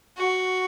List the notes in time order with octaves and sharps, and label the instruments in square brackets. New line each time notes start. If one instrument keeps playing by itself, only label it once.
[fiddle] F#4